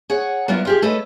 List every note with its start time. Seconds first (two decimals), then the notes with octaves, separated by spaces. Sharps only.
0.10 G#4 C#5 F#5
0.48 F#3 B3 D4 E4 F4 A#4
0.65 F4 G4 G#4
0.82 A3 A4 B4 C#5 D#5